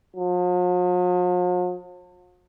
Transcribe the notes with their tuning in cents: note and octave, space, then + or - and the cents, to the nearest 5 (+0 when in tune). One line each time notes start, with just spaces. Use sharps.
F3 +45